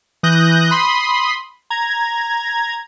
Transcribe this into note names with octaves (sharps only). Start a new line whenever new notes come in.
E3 D#6 F#6 G6 A#6
B5 C6 D#6
A#5 G#6